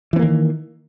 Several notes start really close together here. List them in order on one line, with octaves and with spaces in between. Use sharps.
E3 C4 A#3 D#3